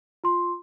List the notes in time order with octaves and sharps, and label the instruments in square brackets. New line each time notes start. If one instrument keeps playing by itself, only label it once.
[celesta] F4 C6